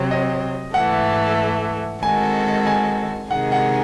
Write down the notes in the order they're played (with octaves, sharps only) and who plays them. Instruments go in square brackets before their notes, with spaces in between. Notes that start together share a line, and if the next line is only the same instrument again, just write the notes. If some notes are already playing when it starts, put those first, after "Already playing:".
Already playing: [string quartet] C3 F#3 C4
[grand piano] D#5
[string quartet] G#2 E3 A3 [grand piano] F#5
[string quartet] D#3 G#3 C4 F#4 A4 [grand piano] G#5
[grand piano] G#5
[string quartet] C3 D#3 G#3 D#4 G#4 [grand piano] F#5
[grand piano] F#5